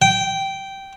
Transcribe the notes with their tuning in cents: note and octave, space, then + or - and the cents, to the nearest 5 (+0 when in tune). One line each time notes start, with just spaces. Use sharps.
G5 -10